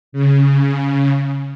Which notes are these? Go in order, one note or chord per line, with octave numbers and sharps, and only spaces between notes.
C#3